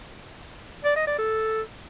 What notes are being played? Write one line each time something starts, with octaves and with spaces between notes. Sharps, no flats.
D5
D#5
D5
A4